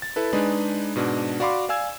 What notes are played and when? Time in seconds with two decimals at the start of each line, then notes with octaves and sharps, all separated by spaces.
0.02 A6
0.16 E4 A4 B4
0.33 G#3 D4 D#4 G#4 B4
0.96 G#2 B2 D4
1.40 F#4 D5 F5 B5 C6 D6
1.69 D5 F5 G#5 E6 G#6